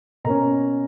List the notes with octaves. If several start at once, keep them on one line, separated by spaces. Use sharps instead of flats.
B2 A#3 C#4 A#5